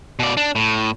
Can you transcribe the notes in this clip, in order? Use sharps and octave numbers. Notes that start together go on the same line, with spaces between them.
B2 D5
D4
A2